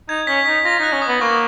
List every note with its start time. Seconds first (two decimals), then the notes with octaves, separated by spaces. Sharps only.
0.09 D#4 G#6
0.27 C#4 B6
0.46 D#4 B6
0.65 F4 A#6
0.79 D#4 F#6
0.92 C#4
1.02 D#6
1.07 B3
1.21 A#3 C#6